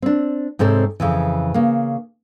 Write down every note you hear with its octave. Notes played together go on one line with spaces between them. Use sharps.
C4 D4
G#2 C3 C4 A4 C#5
F2 C#3 E3
C#3 A#3